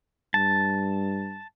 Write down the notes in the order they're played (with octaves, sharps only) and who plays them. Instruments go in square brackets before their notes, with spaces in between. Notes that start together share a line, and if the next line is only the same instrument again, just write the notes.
[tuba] G2 [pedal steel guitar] A5